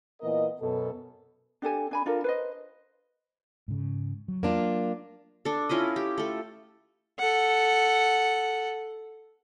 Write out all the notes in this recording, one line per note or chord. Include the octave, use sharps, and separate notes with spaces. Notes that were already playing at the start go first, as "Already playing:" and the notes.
A#2 E3 B3 A#4 D#5
F#2 B2 A4
D4 G4 A4 G#5
D4 G#5 B5
D4 F4 A4 A#4
B4 C5 D#5
G#2 C#3
F#3
A#3 D4 F4
D4 A4
C#4 E4 F4 D#5
G4
A3 A4
A4 F#5